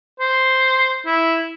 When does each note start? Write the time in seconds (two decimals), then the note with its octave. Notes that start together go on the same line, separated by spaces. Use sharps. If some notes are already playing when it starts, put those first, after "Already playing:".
0.20 C5
1.06 E4